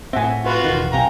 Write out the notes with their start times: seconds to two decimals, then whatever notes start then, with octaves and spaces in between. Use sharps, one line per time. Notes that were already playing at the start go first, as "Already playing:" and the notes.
0.13 A2 C4 E5 F#5 G#5
0.46 F4 F#4 B4
0.64 E1 D#3
0.93 B1 C3 F5 G5 G#5 A#5